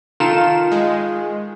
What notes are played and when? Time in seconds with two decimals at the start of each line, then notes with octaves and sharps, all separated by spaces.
0.20 D#3 F4 A4 A#4 E7
0.71 G#3